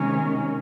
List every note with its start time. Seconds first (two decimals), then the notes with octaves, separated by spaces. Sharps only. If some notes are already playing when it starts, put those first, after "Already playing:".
Already playing: C3 D#3 G#3 C#4